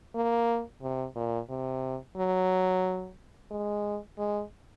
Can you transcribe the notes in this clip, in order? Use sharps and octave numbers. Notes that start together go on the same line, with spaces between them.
A#3
C3
A#2
C3
F#3
G#3
G#3